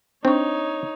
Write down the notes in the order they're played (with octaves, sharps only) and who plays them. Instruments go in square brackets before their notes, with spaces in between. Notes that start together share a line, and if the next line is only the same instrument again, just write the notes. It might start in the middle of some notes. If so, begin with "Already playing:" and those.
[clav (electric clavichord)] C4 [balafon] D4 C#6 [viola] D#4 C#5